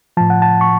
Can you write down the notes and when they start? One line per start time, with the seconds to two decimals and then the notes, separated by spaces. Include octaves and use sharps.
0.17 A2 F3 A5
0.30 F#5
0.42 A5
0.61 C#6